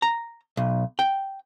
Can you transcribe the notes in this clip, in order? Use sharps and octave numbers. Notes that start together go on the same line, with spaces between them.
A#5
B1
G5